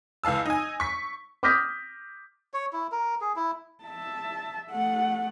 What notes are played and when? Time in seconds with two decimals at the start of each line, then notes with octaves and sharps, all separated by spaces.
0.24 C#2 E3 F5 A5 E6
0.46 D#4 G#5
0.80 C#6 B6
1.43 D6 D#6 F6 G6 A#6 B6
2.54 C#5
2.73 E4
2.92 A#4
3.21 G#4
3.36 E4
3.84 E5 A5
4.71 A3 F#5